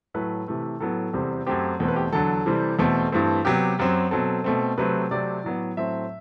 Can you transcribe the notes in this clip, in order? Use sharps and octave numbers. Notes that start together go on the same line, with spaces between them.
A2 F#3 A3 B4
C3 E3 A3
A2 F#3 B3 A4
E2 C3 G3 C4
F#2 F#3 A3 C4 G4
E2 B2 A3 C4 A4
B4
G4
E2 D3 F#3 A4
C3 E3 G3 C4
E2 B2 A3 C4
G2 E3 A3 C4
C3 F#3 B3 G4
F#2 F#3 C4
B2 F#3 C4 A4
B2 A3 C4
C3 F#3 A3 C4 B4
C3 F#3 A3 C4 D5
A2 F#3 B3
A2 F#3 A3 C4 E5